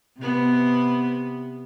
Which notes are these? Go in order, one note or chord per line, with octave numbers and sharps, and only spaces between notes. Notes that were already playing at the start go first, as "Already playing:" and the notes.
C3 B3